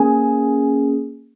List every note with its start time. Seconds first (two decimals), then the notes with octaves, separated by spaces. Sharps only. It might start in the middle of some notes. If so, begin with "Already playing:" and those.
Already playing: A#3 C#4 G#4 G#5